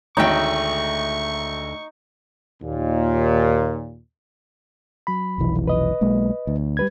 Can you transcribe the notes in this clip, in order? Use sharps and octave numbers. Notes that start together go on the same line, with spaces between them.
G#1 D2 A3 D#4 C#5 G5 C#6
D#2 A#2
F#3 B5
F1 B1 E3
B4 D#5
B1 G#3 A#3
D2
G3 B4 G#6